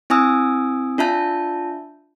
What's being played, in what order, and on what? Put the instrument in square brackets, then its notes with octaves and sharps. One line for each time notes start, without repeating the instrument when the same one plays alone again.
[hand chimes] C4 E4 G#5 D#6 E6
D4 F4 E5 A5 G6